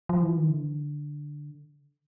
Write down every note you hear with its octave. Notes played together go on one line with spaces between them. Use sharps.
F3
E3
D#3
D3